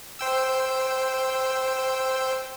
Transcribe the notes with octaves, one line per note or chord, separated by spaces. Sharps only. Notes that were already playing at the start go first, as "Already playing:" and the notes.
C5 G5 E6